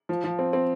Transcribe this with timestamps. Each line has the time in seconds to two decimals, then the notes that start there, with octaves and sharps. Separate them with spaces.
0.09 F3
0.24 F3
0.39 C4
0.53 C4